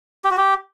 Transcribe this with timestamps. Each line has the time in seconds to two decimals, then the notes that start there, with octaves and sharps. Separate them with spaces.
0.24 G4
0.31 F#4
0.37 G4